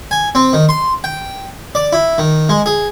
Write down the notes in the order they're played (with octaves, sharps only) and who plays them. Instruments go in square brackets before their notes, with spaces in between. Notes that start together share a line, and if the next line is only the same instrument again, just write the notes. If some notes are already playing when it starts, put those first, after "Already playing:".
[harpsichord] G#5
C4
D#3
C6
G5
D5
E4
D#3
G#3
G#4